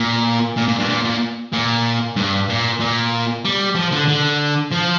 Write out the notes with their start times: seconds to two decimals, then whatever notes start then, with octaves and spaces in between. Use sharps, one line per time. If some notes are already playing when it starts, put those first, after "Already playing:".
Already playing: A#2
0.57 A#2
0.68 A#2
0.79 G2
0.89 A#2
1.05 A#2
1.53 A#2
2.16 G2
2.49 A#2
2.80 A#2
3.45 G3
3.75 F3
3.92 D3
4.08 D3
4.72 F3